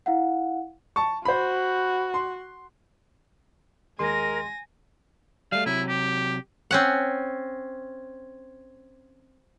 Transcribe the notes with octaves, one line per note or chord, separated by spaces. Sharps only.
E4 F5 F#5
A5 C#6
F#4 C5 B5
C6
D#2 G#3 A#4 G#5 C6 A#6
G3 A3 F5
C3 F#3 E4
G4
C4 C#4 F#5